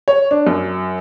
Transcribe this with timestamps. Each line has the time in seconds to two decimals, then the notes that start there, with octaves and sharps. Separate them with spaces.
0.08 C#5
0.31 D4
0.47 F#2